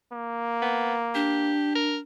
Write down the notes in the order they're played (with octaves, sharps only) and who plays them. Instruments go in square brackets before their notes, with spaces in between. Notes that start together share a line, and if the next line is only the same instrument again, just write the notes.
[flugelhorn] A#3
[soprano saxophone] B3
[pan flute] D4 [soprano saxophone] G4
[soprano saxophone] A#4